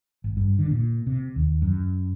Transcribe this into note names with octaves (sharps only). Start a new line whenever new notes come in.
G#1
G2
D3
A#2
C3
D#2
F#2